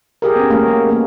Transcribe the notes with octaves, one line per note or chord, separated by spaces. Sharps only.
G4 G#4 A#4
B3 C#4
A3 A#3 C#4 G#4 A#4
G#3
G#3 A#3 B3